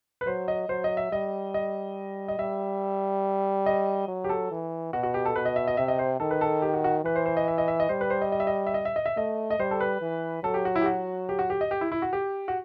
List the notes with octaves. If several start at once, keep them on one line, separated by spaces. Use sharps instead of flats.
B4
F#3 C5
D#5
F#3 C5
D#5
E5
G3 D#5
D#5
D#5
G3 E5
D#5
F#3
G4
A4
E3
B2 F#4
F#4
G4
A4
B2 B4
D#5
E5
D#5
C3 E5
D#5
C5
D#3 A4
B4
A4
G4
F#4
F#4
E3 B4
C5
C5
D#5
E5
D#5
E5
D#5
G3 C5
B4
C5
D#5
D#5
E5
D#5
E5
D#5
E5
D#5
E5
A3 D#5
D#5
G3 C5
A4
B4
E3
F#3 A4
G4
F#4
E4
G4
F#4
G4
F#4
G4
D#5
G4
E4
E4
F#4
G4
F#4